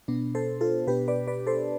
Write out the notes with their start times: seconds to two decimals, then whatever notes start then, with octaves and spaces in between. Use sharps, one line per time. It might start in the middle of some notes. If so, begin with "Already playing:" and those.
0.08 B2 B3 D4
0.35 A4 C5
0.61 F4 A4
0.87 B2 B3 D4 G4 B4
1.08 B4 D5
1.27 B4 D5
1.47 A4 C5